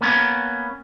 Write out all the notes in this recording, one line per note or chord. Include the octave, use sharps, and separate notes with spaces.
A#3 B3 C#4